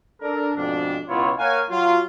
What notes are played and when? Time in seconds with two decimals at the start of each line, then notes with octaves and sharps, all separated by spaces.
0.21 D4 A4 A#4
0.55 F2 G#2 B2 D4
1.08 C#2 B2 B3 E4 F4 C#5
1.38 A#3 A#4 C#5 F5 F#5 G#5
1.69 F#3 F4